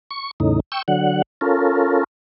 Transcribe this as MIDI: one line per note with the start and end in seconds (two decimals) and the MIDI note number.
0.11 0.31 85
0.40 0.60 40
0.40 0.60 45
0.40 0.60 49
0.40 0.60 63
0.72 0.82 79
0.72 0.82 85
0.72 0.82 88
0.88 1.22 50
0.88 1.22 54
0.88 1.22 78
1.41 2.04 61
1.41 2.04 65
1.41 2.04 69
1.41 2.04 70